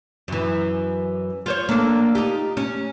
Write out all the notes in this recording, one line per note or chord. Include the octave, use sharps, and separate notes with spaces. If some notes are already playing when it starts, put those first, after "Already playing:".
F#2 E3
F4 C5 C#5
A#3 D4 A4
D#4 F4 G4
C#4